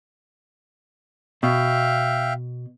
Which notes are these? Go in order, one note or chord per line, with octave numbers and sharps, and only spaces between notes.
B2 E5 F5 G5